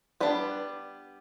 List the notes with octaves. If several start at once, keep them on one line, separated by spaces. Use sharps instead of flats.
G3 B3 D4 B4